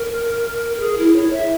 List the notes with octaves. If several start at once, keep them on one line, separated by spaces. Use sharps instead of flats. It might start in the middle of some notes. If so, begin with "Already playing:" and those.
Already playing: A#4
A#4
G#4
E4
C#5
E5